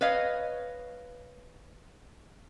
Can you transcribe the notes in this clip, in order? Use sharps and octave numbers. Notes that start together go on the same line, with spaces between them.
B4 C#5 D#5 F5